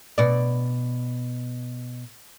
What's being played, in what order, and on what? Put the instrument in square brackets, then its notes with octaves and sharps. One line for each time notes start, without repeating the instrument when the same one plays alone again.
[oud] B2 D5